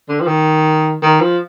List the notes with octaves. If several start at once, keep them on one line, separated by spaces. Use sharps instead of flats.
D3
F3
D#3
D#3
F3